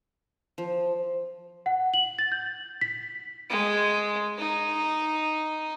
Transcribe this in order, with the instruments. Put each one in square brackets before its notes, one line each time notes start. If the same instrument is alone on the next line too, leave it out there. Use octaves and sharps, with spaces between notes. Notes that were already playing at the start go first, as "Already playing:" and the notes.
[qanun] F3
[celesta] F#5
F#7
A6
G6
B6
[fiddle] G#3
D#4